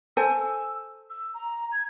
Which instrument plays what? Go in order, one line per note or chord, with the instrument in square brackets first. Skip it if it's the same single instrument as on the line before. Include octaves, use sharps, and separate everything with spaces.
[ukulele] A4 C5 G#5 [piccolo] E6
[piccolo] E6
A#5
G#6